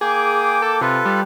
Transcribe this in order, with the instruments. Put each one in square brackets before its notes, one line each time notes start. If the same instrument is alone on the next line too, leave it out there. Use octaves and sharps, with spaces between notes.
[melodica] A#3 G5 D6 [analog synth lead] G#4
[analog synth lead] A4
[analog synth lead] C3 [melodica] F4 A4 B4
[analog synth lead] G3